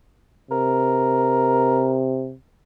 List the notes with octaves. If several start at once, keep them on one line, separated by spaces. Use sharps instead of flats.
C3 A#4